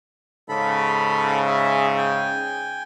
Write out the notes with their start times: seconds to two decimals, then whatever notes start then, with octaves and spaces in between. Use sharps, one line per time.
0.49 G#2 C#3 A4 B5
1.47 G#4 E5
1.98 G5 G#5